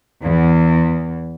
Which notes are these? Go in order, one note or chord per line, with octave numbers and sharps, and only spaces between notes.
E2